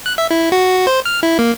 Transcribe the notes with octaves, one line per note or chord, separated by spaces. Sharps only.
F#6
E5
E4
F#4
C5
F6
E4
A#3